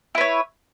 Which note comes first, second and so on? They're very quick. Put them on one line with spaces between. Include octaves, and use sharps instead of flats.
E4 B4 C#5